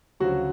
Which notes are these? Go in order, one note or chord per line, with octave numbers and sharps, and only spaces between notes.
D2 C#3 F3 F#3 F#4